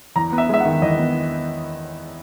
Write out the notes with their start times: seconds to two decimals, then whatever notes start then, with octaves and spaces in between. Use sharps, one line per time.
0.16 E2 A#5
0.32 B3
0.38 E5
0.49 G#3 E5
0.60 F#5
0.65 D#3
0.82 E2 D#5
0.99 B3